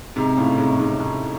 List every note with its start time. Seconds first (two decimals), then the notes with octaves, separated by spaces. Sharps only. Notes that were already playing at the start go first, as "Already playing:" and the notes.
0.16 G#2 C3
0.37 A2 C#3
0.58 G#2 C3
0.79 G#2 C3
1.00 G#2